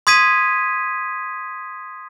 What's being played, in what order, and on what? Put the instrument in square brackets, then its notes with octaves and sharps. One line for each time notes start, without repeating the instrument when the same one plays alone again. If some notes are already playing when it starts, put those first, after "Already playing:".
[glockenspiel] C6 D#6 G#6 B6 D#7